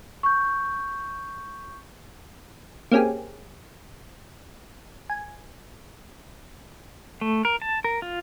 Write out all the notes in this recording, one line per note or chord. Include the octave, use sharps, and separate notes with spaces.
C#6 G6
A#3 C4 C#4 G4 G#4
G#5
A3
A#4
A5
A#4
F4